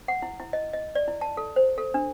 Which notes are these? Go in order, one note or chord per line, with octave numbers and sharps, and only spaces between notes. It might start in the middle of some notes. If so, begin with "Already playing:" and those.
F#5
E4
E4
D#5
D#5
D5
E4
A5
A4
C5
A4
D4